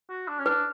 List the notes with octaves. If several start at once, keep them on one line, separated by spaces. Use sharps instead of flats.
F#4
D4
C#4
D4 B4